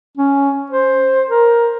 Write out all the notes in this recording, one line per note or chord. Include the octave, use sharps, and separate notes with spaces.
C#4
C5
A#4